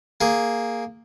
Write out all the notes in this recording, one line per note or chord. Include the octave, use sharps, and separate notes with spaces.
A#3 G#4